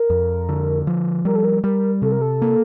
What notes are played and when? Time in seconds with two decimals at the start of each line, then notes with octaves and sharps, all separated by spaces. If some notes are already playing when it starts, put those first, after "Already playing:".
Already playing: A#4
0.10 F2
0.49 D3
0.87 F3
1.25 G3 A#4
1.35 A4
1.44 A#4
1.64 G3 A#4
2.02 C3 A4
2.12 A#4
2.22 A4
2.42 A#3